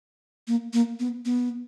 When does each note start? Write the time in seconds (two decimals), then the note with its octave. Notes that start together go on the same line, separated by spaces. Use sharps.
0.48 A#3
0.73 A#3
1.00 B3
1.25 B3